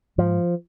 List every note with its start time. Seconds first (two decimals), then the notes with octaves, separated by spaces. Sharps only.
0.18 G#2 F3